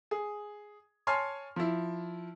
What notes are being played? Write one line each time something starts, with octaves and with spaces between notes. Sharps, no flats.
G#4
C#5 G#5 A5 C6 F6 C7
F3 E4